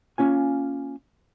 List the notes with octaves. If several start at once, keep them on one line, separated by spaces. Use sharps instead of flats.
A#3 C#4 F4 G#5